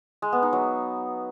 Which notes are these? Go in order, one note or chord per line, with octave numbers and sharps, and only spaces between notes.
G#3
B3
D#4
F#3